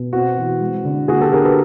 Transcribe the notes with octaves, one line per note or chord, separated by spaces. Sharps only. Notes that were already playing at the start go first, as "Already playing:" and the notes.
Already playing: B2
C4 F#4
E3
G#3
D3
A#3 F#4 G#4
G4 A4
D4 G#4 A#4
A4 B4